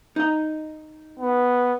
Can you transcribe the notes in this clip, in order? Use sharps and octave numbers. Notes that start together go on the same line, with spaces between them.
D#4 D#5
B3